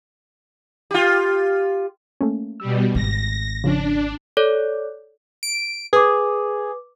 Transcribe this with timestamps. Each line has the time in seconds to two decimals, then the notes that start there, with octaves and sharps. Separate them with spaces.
0.91 F4 G4
2.21 A3 A#3 C#4
2.60 B2 G3 E6
2.95 G#1 A#6
3.64 C#3 F3 C#4 D4
4.37 A4 C#5 D5
5.43 D7
5.93 G#4 B4 D6